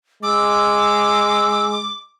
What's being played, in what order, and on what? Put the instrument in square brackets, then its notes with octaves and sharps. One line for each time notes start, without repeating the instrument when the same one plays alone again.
[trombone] G#3 [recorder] D6 [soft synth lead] E6